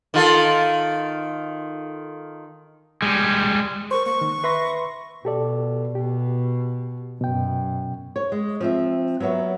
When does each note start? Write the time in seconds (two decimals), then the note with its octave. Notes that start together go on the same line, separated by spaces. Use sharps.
0.14 D#3 F4 A4
3.02 G3 G#3
3.91 A#4 C5 C#6
4.06 A#3 C#6
4.21 D#3
4.44 B4 E5 B5 C6 A#6
5.25 B2 G4 A4 D5
5.95 B2 G4
7.21 F#2 B2 G5
8.16 C#5
8.32 G#3
8.60 F3 C4 E5
9.20 F#3 A#3 B3 C#5 E5